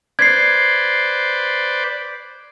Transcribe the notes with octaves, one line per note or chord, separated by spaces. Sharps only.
B4 C5 D5 G#6 C7